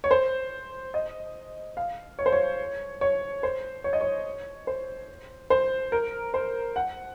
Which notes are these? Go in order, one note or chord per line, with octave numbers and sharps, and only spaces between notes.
C#5
C5
D#5
F5
C#5
C5
C#5
C#5
C5
C#5
D#5
C#5
C5
C5
A#4
C5
F#5